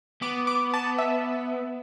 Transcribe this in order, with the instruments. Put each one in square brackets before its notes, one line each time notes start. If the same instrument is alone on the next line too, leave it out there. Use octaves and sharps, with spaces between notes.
[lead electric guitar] B3 [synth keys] D6
[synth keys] D6
A5
E5